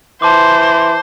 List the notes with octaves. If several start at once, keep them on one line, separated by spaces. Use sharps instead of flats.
E3 C5 A5 C6 D6